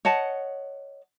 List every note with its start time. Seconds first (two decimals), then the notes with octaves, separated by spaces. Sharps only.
0.05 C#5 D#5 F#5 A5